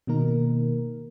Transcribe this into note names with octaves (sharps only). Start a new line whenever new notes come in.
B2 D#3 A#3 D#4 A#4